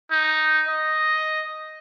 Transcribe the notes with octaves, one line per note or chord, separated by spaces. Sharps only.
D#4
D#5